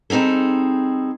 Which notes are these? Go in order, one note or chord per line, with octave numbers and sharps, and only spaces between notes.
G3 C4 D#4 G#4 A4